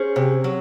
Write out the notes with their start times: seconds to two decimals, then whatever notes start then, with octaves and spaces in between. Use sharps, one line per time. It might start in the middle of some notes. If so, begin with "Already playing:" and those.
Already playing: C#4 G#4 C5
0.16 C3
0.44 F#3